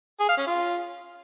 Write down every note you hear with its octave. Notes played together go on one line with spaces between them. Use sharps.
G#4
F5
C#4
F4